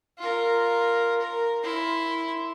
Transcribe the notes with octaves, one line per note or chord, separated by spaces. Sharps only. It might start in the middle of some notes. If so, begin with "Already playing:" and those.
F4 A#4
A#4
E4 C6